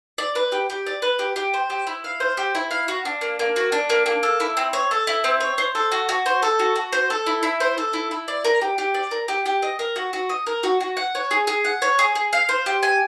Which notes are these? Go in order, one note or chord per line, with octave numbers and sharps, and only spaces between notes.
D5
B4
G4
G4
D5
B4
G4
G4
C5
G4
E4
F5
C5
G4
E4
F5
F#4
D4
A#3
A#3
F#4
D4
A#3
A#3
A4
E4
C4
C#5
A4
E4
C4
C#5
C5
A4
F#4
F#4
C5
A4
F#4
F#4
C5
A4
E4
E4
C5
A4
E4
E4
D5
A#4
G4
G4
D5
A#4
G4
G4
D#5
A#4
F#4
F#4
D#5
A#4
F#4
F#4
F#5
C#5
G#4
G#4
F#5
C#5
G#4
G#4
F5
C5
G4
G#5